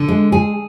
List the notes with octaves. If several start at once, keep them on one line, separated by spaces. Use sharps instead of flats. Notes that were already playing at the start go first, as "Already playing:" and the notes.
Already playing: D3
G#3
G#4